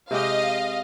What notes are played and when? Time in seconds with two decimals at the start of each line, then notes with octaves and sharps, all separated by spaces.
0.11 C3 G#3 G4 D#5 F5